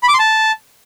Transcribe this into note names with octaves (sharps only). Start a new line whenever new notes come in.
B5
D6
C6
A5